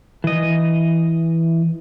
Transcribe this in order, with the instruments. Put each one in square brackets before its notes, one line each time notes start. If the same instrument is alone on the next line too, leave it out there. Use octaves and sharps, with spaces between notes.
[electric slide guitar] E3 D#5